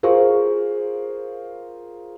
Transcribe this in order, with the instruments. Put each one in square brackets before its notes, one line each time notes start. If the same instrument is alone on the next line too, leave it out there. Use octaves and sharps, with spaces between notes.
[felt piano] F4 G#4 A#4 C5 F5 C#6